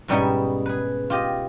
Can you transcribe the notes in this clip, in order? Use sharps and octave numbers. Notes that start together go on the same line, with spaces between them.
G#2 B2 G3 C#4 D#4 E4
G#4 B4
F4 G4 D#5